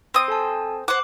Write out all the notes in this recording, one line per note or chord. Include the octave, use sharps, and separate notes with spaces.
C4 C6 D#6
A4 G#5 A5
C5 F#5 D6